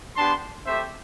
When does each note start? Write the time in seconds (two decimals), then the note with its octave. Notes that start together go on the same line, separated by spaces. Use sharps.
0.16 B3 D4 G4 A5 C6
0.65 A3 C4 G4 C5 E5